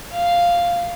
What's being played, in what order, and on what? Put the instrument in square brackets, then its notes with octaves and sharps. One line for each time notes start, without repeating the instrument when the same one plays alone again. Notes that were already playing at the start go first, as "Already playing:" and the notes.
[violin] F5